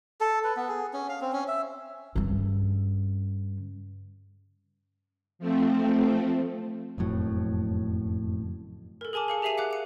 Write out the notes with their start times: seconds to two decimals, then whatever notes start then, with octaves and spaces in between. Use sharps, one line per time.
0.21 A4
0.44 B4
0.56 B3
0.69 G#4
0.93 C#4
1.09 F5
1.21 C4
1.33 C#4
1.48 E5
2.16 G2 C#3
5.39 F3 A3 C4
6.98 F#1 F2 A2 F#3
9.01 A4 A#4
9.13 G#4 A#4 G#5 A5 D6
9.28 G#4 F5 C#7
9.42 G4 G#4 E5 C7 D#7 F7
9.57 F5 F#5 D6 F#6
9.71 F#5 C#7